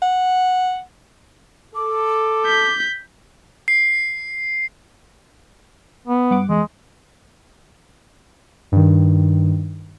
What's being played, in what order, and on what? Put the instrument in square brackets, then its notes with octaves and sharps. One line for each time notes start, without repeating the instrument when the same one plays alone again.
[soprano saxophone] F#5
[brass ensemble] A4 [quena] D6
[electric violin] G6 B6
[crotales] C7
[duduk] B3
[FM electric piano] G2 F#5 D6
[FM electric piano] E2 [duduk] G#3
[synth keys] G2 D#3